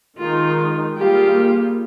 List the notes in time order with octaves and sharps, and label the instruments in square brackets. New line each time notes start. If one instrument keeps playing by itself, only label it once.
[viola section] D#3 G#3 D#4 [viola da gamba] F4
[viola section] G3 A#3 F4 G#4 [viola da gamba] G4